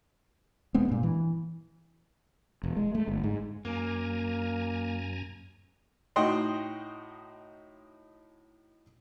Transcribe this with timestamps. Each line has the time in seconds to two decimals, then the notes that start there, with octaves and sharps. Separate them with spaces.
0.74 E1 G#3 B3 C4
0.88 G2 A#2
1.03 E3
2.63 E1
2.77 G#3
2.95 A3
3.08 G1
3.23 G#2
3.65 F#2 A#3 G#5 A#5
6.16 A2 D#4 F#4 D#5 G5 C6